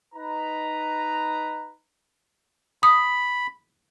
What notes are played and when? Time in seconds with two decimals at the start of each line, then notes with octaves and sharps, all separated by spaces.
0.15 D#4 B4 A#5
2.83 B5 D#6